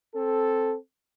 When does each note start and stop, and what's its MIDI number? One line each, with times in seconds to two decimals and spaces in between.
0.14 0.76 60
0.14 0.76 69